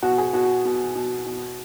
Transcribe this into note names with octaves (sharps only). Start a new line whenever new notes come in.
B2 F#4
G#4
B2 F#4
B2
B2
B2